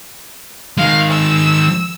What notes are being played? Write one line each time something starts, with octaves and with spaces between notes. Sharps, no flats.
D#3 G#3 F5
E6